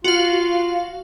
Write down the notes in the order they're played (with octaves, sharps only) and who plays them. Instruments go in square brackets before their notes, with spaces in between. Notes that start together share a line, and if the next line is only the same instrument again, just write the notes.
[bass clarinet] F4 [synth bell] F#4 F5